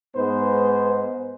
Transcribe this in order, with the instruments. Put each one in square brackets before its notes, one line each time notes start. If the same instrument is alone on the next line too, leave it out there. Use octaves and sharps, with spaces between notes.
[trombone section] G#2 G#3 B3 D#4 B4 C5